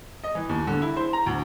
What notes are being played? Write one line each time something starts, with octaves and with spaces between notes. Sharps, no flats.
D#5
E3
D#2
D3
E4
C5
A#5
D2